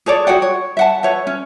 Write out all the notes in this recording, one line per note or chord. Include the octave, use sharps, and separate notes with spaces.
G#4 A4 C#5 D5
F#4 G#4 F#5 G5
C#5
E5 F#5 A5
B4 C#5 E5
C#4